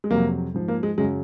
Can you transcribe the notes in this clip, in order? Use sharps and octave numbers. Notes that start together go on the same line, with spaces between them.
G#3
F2 C3 F#3 A#3
G#2 F3
A#3
G#3
F#2 C#3 F#3 G#3